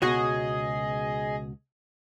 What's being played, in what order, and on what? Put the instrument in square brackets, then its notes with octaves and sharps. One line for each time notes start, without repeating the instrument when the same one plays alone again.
[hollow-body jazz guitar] C#2 B2 F#4 [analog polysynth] G#4 D#5